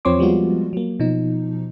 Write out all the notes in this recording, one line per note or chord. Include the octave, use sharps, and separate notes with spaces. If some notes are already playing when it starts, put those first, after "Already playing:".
E2 F3 C4 C#5 C6 D6
F3 G3 G#3 B3 F4 F#4
F#3 A#3
B2 F3 D#4